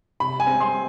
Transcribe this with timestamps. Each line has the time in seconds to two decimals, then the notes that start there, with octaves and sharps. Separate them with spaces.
0.20 C3 B5
0.40 G#5
0.47 C4
0.61 C6